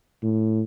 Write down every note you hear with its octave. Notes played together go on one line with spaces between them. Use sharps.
A2